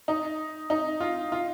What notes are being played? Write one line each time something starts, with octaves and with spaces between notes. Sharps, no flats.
D#4
D#4
F4
F4